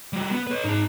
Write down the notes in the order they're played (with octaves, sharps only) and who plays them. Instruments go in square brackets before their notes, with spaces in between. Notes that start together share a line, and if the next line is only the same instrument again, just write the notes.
[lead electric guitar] G3 F#4
B3
B4 C#5
[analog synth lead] G#2 [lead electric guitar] D#4 A5